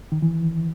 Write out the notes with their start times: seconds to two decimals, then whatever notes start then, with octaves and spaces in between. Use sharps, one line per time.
0.12 D#3
0.22 E3